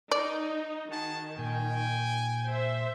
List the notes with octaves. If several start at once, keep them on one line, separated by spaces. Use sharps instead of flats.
D#4 D5
D#3 F#4 G#4 A5
A#2 G5 G#5
C5 E5